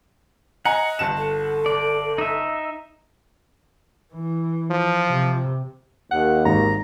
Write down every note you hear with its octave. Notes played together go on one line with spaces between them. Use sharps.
D#5 F#5 G#5 A#5 C#7
G1 A5 E7
A4
D5
D#4 E5
E3
F3
C3
D#2 F#5
G#1 G#2 A#5